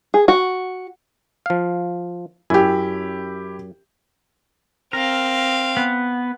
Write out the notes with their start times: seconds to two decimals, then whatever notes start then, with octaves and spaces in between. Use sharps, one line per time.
0.14 G#4
0.28 F#4
1.46 F3 F5
2.50 F#2 E4 G4 G#5
4.93 C4 A#4 F5
5.77 B3